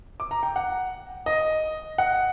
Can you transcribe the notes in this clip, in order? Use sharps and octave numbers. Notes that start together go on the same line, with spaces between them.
D6
A#5
G5
F#5
D#5
F#5